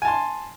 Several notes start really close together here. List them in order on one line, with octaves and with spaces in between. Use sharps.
G#5 A5 C6